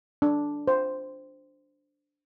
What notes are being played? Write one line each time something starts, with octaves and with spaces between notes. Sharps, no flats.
D4
C5